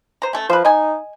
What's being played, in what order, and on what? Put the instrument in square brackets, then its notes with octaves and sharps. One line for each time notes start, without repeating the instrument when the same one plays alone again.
[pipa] C5 A#5
A3 C#4
[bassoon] F3 [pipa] B4 C5
[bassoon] D#4 [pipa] D#5 G#5